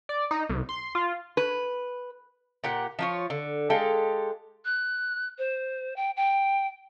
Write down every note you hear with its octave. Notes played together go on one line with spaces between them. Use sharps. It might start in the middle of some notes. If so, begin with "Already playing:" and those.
D5
D#4
C2
C6
F4
B4
A#2 G4 F#5
F3 F4 C#5
D3
G#3 G4 A4 F5
F#6
C5
G5
G5